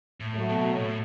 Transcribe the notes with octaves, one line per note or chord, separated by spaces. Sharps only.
A2
F#3 A3
B2
A2